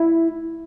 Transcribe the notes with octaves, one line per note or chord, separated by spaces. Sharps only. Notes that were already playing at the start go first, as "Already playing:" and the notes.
Already playing: E4